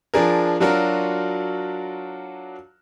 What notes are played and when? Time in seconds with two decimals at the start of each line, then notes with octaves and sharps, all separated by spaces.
0.14 F3 D4 G#4 A#4
0.60 F#3 D4 F4 F#4 A#4